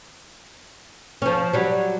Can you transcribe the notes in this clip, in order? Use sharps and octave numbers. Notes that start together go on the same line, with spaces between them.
F3 C#4
F#3 G3